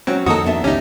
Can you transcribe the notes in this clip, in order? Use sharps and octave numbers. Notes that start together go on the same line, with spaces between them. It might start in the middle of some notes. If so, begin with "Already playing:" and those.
F#3 C4 C#4 F#4
F2 D#3 A#3 F#4 A4 D#5 A#5 D#6
B3 D4 E5
F#1 C#2 C#4 D#4 G4